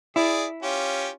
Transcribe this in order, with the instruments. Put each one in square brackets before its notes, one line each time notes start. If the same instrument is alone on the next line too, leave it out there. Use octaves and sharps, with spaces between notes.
[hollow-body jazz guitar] E4 [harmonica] G#4 D5
[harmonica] C#4 F4 G4